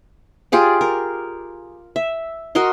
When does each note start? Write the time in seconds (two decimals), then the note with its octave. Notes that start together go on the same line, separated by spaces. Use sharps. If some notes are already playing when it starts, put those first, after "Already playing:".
0.52 F4 G4 G#4 D5
0.81 A#4
1.96 E5
2.55 F#4 A#4 D#5 C6